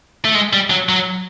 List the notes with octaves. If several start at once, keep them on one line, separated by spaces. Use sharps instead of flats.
A3
G#3
G3
F#3
F#3